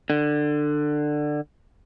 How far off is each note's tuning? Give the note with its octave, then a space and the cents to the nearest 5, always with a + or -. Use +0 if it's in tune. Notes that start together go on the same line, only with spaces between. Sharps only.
D3 +20